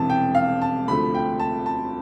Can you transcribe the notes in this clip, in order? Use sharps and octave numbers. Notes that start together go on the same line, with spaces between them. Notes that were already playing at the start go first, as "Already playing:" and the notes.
Already playing: E1 C3 E3 A5
G5
F5
A5
D2 C3 F3 A3 B5
G5
A5
A5